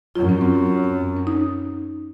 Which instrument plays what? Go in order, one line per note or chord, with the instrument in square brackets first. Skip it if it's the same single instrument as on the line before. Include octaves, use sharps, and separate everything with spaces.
[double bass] F#2 [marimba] F4
[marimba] C#4
C4
C#4
D#4